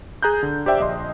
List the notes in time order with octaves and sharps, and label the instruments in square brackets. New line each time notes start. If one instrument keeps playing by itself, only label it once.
[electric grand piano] G#4 A#5 F#6 G6
D3
G4 C5 D5 E5 G5
A#1 D#5 C6